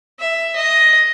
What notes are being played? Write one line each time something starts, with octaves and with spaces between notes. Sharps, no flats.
E5
D#5